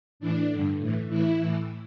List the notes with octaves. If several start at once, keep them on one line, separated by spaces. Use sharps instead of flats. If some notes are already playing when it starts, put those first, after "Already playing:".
A2 E3 D4
G2 D3
A2 E3
A2 E3 E4
A2 E3